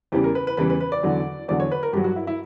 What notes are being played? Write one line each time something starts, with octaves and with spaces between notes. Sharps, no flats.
E2 C#3 E3 G3 G4
A#4
B4
B4
E2 C#3 E3 G3 B4
B4
B4
D5
E2 D3 F#3
E2 D3 F#3 D5
C#5
B4
A#4
G2 F#3 G4
F#4
E4
E4